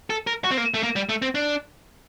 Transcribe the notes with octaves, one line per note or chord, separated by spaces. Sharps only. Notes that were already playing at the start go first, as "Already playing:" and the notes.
A4
A#4
F#4
C4
A#3
A3
A#3
G3
A3
C4
D4